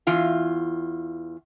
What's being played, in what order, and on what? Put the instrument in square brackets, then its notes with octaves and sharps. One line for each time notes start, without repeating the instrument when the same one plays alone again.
[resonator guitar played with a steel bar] E2 E3 F4 F5